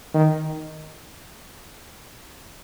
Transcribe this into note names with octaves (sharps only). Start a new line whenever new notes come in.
D#3